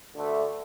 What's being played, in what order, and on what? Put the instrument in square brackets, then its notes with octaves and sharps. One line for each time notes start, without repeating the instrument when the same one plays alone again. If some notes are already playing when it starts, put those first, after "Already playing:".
[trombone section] D2 D3 A3